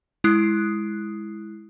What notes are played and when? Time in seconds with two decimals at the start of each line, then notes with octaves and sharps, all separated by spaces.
0.24 G#3 E4 D#6 F#6 C7